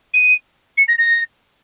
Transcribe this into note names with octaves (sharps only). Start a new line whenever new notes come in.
D#7
C#7
A#6
A#6